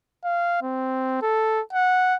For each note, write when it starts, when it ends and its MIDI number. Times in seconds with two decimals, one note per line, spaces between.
0.24 0.61 77
0.62 1.20 60
1.22 1.61 69
1.73 2.15 78